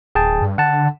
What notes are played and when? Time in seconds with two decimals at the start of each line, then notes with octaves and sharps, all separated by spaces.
0.15 D1 G#4 G5 A5
0.42 G2
0.58 D3 F#5 A5